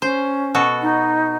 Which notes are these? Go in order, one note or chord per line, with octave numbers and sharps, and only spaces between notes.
C#4 C5
B2 F#4 A4
D#4